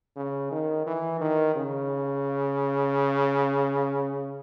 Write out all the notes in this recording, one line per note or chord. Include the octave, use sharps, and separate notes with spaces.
C#3
D#3
E3
D#3
C#3